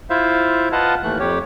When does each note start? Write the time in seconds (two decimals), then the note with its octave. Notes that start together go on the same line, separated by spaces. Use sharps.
0.10 E4 F4 C5 E5 F5
0.72 F4 B4 D#5 F5 F#5 A5
1.03 D#2 E3 A3 F#6
1.19 F2 G4 C#5